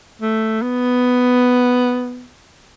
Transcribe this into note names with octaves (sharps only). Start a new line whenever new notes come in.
A3
B3